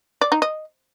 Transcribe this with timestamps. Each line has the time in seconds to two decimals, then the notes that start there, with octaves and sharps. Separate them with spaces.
0.21 D5
0.32 D#4
0.42 D#5